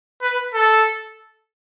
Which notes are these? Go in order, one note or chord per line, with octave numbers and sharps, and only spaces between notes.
B4
A4